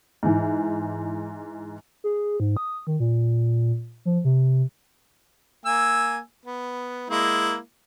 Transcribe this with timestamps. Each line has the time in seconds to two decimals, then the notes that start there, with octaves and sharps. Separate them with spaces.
0.23 G#2 E3
2.04 G#4
2.40 G#2
2.57 D#6
2.87 D#3
3.00 A#2
4.05 F3
4.25 C3
5.66 A#3 G#5 E6
6.46 B3
7.10 G#3 A#3 E4